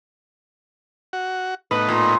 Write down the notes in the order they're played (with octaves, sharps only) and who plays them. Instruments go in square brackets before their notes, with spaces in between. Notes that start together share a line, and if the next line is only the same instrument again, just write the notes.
[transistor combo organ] F#4
[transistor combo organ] A2 B3 D#4 [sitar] B4
[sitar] A#2